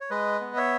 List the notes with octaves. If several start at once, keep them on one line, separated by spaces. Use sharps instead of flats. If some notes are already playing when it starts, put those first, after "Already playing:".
C#5
G#3 B4 D#5
B3
C#5 E5